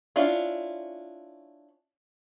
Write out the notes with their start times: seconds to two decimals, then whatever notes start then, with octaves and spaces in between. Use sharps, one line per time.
0.16 C#4 D4 E4 F4